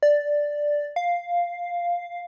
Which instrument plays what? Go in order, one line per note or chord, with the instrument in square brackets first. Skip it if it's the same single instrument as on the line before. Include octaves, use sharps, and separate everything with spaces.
[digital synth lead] D5
F5